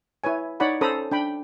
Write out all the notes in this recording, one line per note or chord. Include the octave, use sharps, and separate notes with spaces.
E4 B4 C#5 G#5
D#4 C#5 D5 F#5 B5
C#4 A4 C5 A#5 B5 D#6
D4 G5 B5